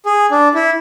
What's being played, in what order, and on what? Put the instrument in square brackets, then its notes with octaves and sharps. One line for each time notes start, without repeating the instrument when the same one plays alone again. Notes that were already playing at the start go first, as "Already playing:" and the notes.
[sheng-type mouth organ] G#4
D4
E4